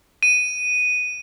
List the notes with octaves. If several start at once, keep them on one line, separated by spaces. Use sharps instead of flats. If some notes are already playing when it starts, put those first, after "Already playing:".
D#7